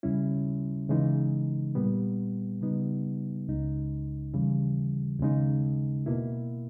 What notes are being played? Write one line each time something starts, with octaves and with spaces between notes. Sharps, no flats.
D#2 C#3 G3 C#4 E4
C#3 E3 G#3 D#4
A#2 G3 B3
C#3 G3 B3 D#4
C#2 C#3 G#3 D#4
D#2 C#3 E3 G3
D#2 C#3 G#3 D#4
B2 A#3 E4